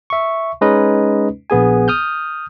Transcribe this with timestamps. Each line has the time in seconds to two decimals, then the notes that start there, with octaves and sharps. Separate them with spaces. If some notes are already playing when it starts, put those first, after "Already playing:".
0.10 E5 C#6
0.61 G#3 C#4 D#4 B4 D#5
1.50 A#1 B3 G#4 G#5
1.88 D#6 F6 G6